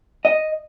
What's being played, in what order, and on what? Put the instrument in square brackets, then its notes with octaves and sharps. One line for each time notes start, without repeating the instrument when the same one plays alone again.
[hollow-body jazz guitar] D#5